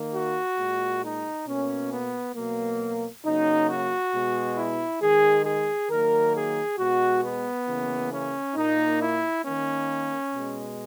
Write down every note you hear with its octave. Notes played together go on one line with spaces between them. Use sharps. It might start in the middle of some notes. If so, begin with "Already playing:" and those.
Already playing: D#3 A#3
F#4
A#2 G#3
D#4
B2 A#3 C#4
B3
B2 F#3 A#3
C#3 F#3 A#3 D#4
F#4
B2 G#3
E4
D#3 G#3 G#4
G#4
D#3 F#3 A#3 A#4
G#4
B2 G#3 F#4
B3
C#3 E3 A#3
C#4
A#2 A#3 D#4
E4
D#3 A#3 C#4
B2 G#3